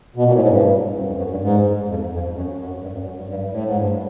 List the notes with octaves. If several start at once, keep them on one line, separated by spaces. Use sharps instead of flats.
B2
A#2
A2
G#2
G2
F#2
F2
F#2
G2
G#2
F2
F2
F#2
F#2
G2
F#2
F#2
G2
G2
A2
G#2
G2